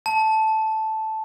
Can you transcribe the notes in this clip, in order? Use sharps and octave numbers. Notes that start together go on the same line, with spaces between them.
A5